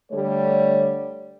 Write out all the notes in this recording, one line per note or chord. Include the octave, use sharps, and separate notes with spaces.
D3 G3 A3 C#5